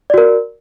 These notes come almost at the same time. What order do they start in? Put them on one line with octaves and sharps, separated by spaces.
D5 F#4 A#4